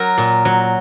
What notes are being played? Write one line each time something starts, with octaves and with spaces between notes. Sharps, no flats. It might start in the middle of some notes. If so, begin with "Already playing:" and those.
Already playing: F#3 A#4
A#2
F#3